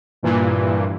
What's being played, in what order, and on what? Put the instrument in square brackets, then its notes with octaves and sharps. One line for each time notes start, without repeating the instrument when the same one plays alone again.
[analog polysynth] G2 A#2 E3